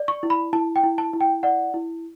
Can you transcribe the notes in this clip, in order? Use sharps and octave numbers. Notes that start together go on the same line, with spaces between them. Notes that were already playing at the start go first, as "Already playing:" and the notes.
Already playing: D5
C#6
E4
B5
E4 A5
G5
E4
A5
E4
G5
D5 F#5
E4